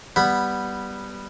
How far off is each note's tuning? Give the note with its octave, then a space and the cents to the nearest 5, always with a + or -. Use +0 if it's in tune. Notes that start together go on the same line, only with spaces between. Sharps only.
G3 +0 B3 -5 B5 +0